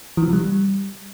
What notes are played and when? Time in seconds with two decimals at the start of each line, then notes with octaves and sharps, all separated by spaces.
0.17 E3
0.23 F3
0.28 C3
0.33 G3